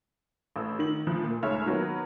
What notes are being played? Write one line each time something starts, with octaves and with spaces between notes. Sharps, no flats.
A1 A4 E6
D#3 F#7
D2 F3
A#2
C#2 G#2 A3 C#5 E5 F6
D#3 F#3 A#3 B3